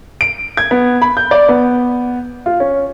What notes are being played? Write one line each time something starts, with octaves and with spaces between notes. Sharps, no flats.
D7
G#6
B3
B5
G6
D5
B3
F4
C#4